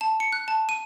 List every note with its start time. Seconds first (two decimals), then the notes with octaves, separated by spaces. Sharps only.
0.01 A5
0.20 C#7
0.32 F#6
0.48 A5
0.69 D#7